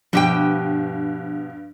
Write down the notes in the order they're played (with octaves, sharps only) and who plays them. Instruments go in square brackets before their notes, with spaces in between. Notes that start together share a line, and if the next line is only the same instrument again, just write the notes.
[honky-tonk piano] G2 [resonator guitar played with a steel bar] B2 G4 G5 [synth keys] F3